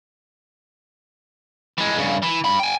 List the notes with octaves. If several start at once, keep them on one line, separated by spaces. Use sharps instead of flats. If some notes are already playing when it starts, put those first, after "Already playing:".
E3 G#3
G2 C#3
E3
G2 B5
G5 G#5